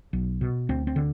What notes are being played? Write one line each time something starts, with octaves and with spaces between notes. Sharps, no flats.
B1
B2
D2 C4
C4
D3